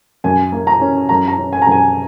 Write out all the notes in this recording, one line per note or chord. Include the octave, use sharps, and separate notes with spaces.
F#2 G#5
A#3
A#5
C#4
F#2 A#5
A#5
C#4
G#5
A#5
F#2
G#5